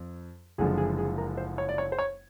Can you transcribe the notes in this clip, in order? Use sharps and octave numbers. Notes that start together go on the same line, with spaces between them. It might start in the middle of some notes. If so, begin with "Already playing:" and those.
Already playing: F2
F#1 F#2 D3 F3 G#3 G#4
G#4
G#4
A#4
C5
C#5
D5
C#5
C5
C#5